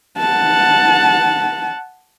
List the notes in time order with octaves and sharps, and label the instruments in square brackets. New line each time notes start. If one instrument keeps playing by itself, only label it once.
[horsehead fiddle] F#5 A5